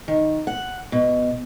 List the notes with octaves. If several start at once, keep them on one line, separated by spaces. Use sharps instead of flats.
D#3
F#5
B2